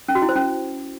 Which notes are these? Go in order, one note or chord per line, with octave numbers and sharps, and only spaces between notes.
C#4
F#4
E4
C5
C#4